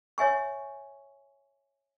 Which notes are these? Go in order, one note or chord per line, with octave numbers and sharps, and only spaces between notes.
C#5 E5 G#5 C#6